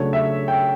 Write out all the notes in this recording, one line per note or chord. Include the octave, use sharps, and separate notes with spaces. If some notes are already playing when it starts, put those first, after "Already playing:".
Already playing: C#3 F#3 A3 D4 C#5
E5
G5